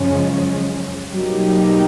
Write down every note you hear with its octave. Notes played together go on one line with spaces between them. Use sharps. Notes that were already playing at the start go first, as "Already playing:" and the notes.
Already playing: F#2 C#3 F3 G#3 C#4
B2 F#3 G3 A#3 D#4 G4